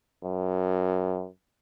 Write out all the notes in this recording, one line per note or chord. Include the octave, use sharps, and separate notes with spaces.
F#2